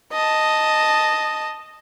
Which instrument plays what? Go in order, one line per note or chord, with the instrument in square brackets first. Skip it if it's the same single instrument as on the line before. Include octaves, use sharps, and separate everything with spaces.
[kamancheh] D#5 A5